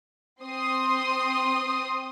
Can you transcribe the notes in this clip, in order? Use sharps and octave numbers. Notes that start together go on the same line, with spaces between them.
C4 C6 D#6